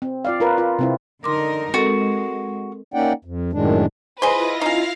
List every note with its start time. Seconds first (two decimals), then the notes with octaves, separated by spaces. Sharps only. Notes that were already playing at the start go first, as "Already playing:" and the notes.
0.02 C4
0.25 F4 D5 F5
0.40 F4 A#4 B4
0.58 F4
0.79 C3 C4 E4
1.24 D3 D#4 A#4 C6 D6
1.74 G#3 C4 F#4 A4 A#4
2.94 A#3 C#4 D#4 D5 F#5 G5
3.25 F2
3.53 F#2 A2 D#3 G#3 D4
4.22 E4 F4 G#4 B4 C5 D#5 A#6
4.61 C#4 D#4 F5